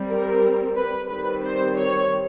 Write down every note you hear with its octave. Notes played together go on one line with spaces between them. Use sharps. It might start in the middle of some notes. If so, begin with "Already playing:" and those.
Already playing: G3 C4
A#4
B4
D#3 G3 C4 B4
C5
C#5